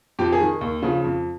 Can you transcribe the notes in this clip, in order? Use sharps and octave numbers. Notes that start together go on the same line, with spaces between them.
F2 G4
G#4
D#3
D#2
C#3 F3
F2